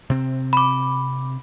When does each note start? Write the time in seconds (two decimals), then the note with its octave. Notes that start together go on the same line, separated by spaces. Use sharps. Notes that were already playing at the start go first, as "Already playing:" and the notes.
0.10 C3 C4
0.53 B5 D6